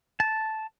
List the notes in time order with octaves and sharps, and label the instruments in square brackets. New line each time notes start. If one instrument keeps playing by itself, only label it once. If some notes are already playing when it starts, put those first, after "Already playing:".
[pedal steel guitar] A5